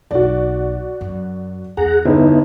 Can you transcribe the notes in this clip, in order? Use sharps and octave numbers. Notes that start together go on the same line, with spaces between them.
B1 F#4 D5
F#2
E2 G#4 F#5 A#5
G1 B3 D#4 E4